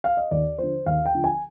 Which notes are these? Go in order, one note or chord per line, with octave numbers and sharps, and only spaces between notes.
F5
D#5
D#2 D5
D3 F3 C5
D#2 F5
G5
D3 F3
G#5